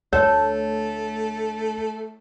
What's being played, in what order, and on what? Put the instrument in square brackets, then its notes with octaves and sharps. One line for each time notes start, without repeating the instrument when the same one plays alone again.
[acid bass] D2 [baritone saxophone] A3 [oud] A4 [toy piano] C#5